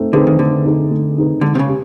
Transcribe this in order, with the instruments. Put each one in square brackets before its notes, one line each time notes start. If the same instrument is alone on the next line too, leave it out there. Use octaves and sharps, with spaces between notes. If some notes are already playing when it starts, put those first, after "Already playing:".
Already playing: [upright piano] A3 C4 D#4
[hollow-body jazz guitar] D3 [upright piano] C4 D#4 G#4 B4
[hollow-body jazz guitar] D#3
[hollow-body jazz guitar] D3 [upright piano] A3
[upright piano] C4 D#4 G#4 B4
A3
C4 D#4 G#4 B4
[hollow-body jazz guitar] D3 [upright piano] G#3
[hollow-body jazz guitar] C3
C#3
[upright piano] G4